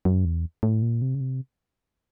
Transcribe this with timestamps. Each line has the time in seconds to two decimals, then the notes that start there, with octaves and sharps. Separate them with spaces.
0.05 F#2
0.25 E2
0.63 A2
0.82 A#2
1.02 C3
1.15 C#3
1.21 C3